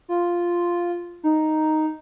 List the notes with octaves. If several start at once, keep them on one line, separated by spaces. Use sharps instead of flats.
F4
D#4